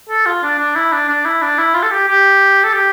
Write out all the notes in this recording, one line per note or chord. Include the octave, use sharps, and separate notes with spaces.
A4
F4
D4
D4
E4
D4
D4
E4
D4
E4
F4
A4
G4
G4
A4
G4